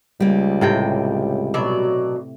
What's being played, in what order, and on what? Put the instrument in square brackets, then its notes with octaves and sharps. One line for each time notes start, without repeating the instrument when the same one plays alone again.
[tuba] C#2 [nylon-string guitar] G3 A#3
[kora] A2 C3 G5
[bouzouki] B2 F#3 D5